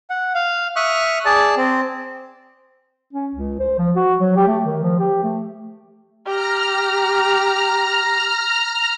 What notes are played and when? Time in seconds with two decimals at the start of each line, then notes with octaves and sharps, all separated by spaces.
0.10 F#5
0.35 F5
0.76 E5 C#6 D#6 F6 F#6
1.25 G#4 D5 A5
1.57 C4
3.13 C#4
3.35 C#2
3.59 C5
3.78 F3
3.96 F#4
4.20 F#3
4.36 G4
4.48 A3
4.65 D#3
4.83 F3
4.99 G4
5.23 A3
6.26 G4 A#5 F6